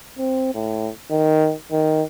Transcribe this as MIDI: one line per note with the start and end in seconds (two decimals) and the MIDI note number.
0.18 0.53 60
0.55 0.89 45
1.11 1.54 51
1.72 2.03 51